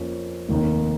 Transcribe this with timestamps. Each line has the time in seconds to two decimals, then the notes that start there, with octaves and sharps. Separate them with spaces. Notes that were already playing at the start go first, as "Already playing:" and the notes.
Already playing: F2 F3 A#3 C#4
0.48 F1 D#2 D#3 A#3 D#4